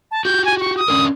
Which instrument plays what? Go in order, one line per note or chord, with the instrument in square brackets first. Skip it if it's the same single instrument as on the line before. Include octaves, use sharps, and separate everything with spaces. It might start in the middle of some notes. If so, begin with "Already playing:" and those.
[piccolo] A5
[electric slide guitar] F#4 G4 [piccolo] G6
[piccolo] G#5
C#6
D#6
[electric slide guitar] C#4 D4 A#4